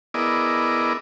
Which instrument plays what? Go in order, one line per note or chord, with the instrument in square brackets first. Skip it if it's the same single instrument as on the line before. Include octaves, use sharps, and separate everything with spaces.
[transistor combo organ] B3 E4 G#4 A#4 D5 D#5